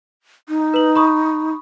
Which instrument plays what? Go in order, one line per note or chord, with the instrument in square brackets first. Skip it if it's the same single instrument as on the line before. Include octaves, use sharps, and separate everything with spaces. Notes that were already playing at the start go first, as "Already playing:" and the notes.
[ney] D#4
[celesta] B4 F#7
B5 C#6 D#6